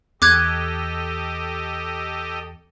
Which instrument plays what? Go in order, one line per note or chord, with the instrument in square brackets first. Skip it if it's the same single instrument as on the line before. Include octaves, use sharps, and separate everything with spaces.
[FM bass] E2 [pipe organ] G4 A4 D#5 [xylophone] D6 F#6 G#6